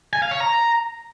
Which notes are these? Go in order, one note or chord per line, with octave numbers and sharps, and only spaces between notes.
G#5
F5
C#5
A#5